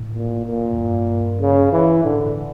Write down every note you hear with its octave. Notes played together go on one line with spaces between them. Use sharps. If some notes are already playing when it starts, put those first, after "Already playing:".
Already playing: A2
A#2
A#2
F2
G2
C#3
E3
A2 D3
A2